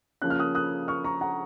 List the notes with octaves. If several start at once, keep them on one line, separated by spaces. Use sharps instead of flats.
C#3 F3 A#3 C#4 F#6
F6
D#6 F#6
D#6 F#6
C#6 F6
A#5 C#6
F#5 A#5